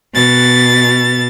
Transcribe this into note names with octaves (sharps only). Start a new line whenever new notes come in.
B2 A6